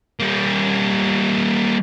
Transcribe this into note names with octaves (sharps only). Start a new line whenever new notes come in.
G3 A#3